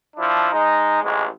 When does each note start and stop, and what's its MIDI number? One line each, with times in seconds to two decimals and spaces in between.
0.17 0.52 53
0.17 0.52 62
0.17 0.52 64
0.52 1.00 56
0.52 1.00 63
1.02 1.25 33
1.02 1.25 41
1.02 1.25 56